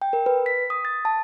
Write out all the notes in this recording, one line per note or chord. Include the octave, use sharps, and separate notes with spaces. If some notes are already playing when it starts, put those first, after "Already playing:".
G5
A#4
B4
B6
D#6
A6
A5